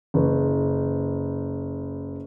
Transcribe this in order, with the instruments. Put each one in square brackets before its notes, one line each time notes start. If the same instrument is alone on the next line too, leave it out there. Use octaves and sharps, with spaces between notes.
[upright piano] F#1 B4